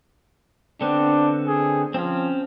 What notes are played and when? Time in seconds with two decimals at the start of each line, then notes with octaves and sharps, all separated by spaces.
0.81 D3 B3 C4 D4
1.47 G#4
1.94 F3 C4 C#4